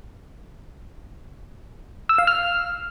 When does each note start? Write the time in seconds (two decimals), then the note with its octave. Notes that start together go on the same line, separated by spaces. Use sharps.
2.09 E6
2.18 F5
2.27 F6